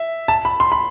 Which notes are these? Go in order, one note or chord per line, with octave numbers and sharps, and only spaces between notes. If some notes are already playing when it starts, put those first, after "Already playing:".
Already playing: E5
A5
B5
C6
B5